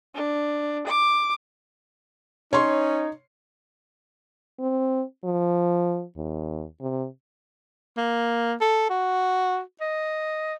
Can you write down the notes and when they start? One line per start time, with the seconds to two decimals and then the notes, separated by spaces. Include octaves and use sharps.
0.15 D4
0.88 D6
2.53 C#4 D#4 C#5 C6
4.60 C4
5.24 F3
6.16 D#2
6.81 C3
7.97 A#3
8.61 A4
8.90 F#4
9.81 D#5